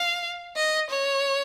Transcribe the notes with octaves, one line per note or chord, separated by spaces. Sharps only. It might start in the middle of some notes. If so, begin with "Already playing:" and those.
Already playing: F5
D#5
C#5